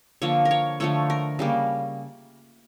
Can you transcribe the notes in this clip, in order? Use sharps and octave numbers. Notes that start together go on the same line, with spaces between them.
D3 F3 A#3 C#5
A#4
C#5
D3 F3 A3 C#5
A#4
C#3 G3 A#3